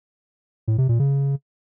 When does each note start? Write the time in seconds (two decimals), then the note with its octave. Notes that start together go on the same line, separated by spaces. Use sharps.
0.68 A2
0.78 C3
0.89 A#2
0.99 C#3